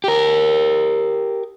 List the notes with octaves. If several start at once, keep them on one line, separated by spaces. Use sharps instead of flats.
G4 A#4